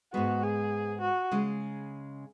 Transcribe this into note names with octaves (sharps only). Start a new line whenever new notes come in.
G#2 G#3 B3 F#4
G#4
F#4
C#3 G#3